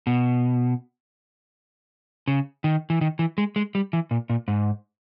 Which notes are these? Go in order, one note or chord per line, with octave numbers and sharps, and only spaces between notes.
B2
C#3
D#3
E3
D#3
E3
G#3
G#3
G3
E3
A#2
A#2
G#2